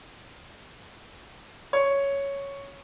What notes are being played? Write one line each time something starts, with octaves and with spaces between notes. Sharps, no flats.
C#5